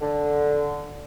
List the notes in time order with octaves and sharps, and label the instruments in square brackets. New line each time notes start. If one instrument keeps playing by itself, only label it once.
[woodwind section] D3